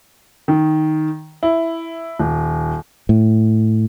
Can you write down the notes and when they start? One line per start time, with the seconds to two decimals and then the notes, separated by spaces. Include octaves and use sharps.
0.48 D#3
1.43 E4
2.19 D#1
3.09 A2